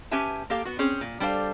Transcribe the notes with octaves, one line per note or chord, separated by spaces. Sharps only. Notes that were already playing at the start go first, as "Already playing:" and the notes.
C#4 G4 B4 E5 G#5 A5
A#3 G4 A4 F5
B3 F#4
C4 C#4 G#4 C5
A#2
G3 D4 A4 C5 F5